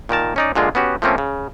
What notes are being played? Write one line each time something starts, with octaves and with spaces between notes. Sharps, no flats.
A#2 D#3 A#4 A5
C#4 D#4 D5
A#2 D3 G#3 F4
B3 C#4 F#4 G4
F3 A3 A#3 C4 C#4
C#3